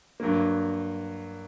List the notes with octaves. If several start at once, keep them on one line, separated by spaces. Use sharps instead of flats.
G2 F#3 A#3